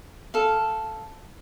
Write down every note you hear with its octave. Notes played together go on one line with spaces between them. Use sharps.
A4 F5